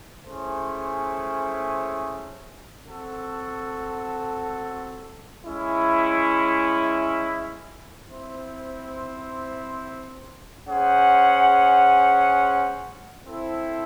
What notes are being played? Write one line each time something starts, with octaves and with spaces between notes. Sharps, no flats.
A3 C#4 E4 G#4 C5
C4 F#4 A4
G#3 C#4 E4
C4 E4 C5
C#4 G#4 C5 F#5
C4 E4 A4 C5